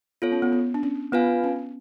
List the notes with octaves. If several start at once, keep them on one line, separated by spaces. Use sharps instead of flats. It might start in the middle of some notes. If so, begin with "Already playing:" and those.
B3 F4 A4 C#5
C#4
B3
B3
D4
C#4
B3 F4 B4 F5 G#5
C#4